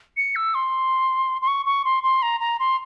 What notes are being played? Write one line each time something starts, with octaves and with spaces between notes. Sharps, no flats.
C#7
E6
C6
C6
C#6
C#6
C6
C6
A#5
A#5
C6